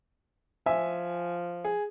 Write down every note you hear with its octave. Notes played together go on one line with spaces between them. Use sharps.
F3 E5 G#5
G#4